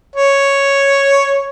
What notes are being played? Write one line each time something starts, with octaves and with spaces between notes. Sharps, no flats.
C#5